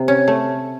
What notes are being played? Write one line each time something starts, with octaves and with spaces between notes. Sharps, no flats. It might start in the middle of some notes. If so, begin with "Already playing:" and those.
Already playing: C3
C#4
A3